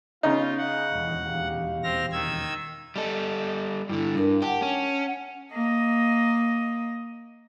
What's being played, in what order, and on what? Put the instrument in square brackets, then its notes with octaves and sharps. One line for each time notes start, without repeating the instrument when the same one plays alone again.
[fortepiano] C#3 D#4 [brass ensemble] B3 [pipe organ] F4
[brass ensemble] G#4 F5 [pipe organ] F#5
[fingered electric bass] D#1 E2
[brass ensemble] G4 F5
[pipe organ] C4 F6 A#6
D#3 E6 G#6
[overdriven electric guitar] G3 A4 [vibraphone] D#5
[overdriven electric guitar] G2 D3 [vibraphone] E4
[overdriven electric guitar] G2 [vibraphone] D4 A#4
[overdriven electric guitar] G4 [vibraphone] F#5 A5
[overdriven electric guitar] C#4
[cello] A#3 D#5